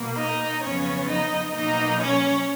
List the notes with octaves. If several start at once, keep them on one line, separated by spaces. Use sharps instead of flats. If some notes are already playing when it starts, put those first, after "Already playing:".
Already playing: B2 A#3
D#4 D#5
F2 C#3 F#3 B3 C#4 C#5
D#4 D#5
B2 F#3 A#3 D#4 D#5
C#4 C#5